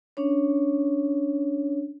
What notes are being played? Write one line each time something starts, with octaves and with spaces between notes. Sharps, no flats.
C#4 D4 C#5